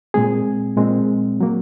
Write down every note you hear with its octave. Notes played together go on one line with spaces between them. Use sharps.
A#2 G#3 C4 G#4
A#2 G#3 C4
F#3 A#3